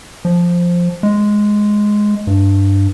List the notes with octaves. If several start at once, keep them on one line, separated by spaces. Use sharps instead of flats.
F3
G#3
G2